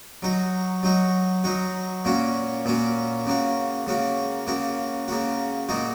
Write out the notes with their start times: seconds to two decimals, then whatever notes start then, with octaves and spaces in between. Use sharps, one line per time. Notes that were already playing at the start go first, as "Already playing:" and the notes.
0.22 F#3 D#4 F#4
0.83 F#3 D#4 F#4
1.44 F#3 D#4 F#4
2.05 A#2 A#3 C#4 F#4
2.65 A#2 A#3 C#4 F#4
3.26 C#3 A#3 F#4
3.87 C#3 A#3 F#4
4.47 C#3 A#3 F#4
5.08 C#3 A#3 F#4
5.69 A#2 A#3 D#4 F#4